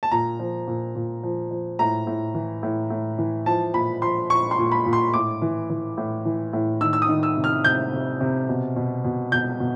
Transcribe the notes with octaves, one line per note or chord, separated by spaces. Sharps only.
A5
A#2 A#5
F3
A#2
A#2
F3
F3
A2 A#5
A2
E3
A2
A2
E3
F3 A5
A#2 B5
F3 C6
A#2 C#6
C6
A#2
B5
A#2
C6
A2 D6
E3
E3
A2
E3
A2
D#3 E6
E6
D#6
D#3
E6
C3
F6
C3 G6
C3
C3
B2
B2
B2
B2 G6
B2